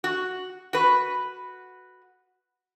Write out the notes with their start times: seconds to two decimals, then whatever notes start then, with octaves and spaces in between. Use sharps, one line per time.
0.04 F#4
0.73 F#4 B4